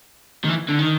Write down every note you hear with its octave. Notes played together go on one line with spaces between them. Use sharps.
D#3
E3
D3
D#3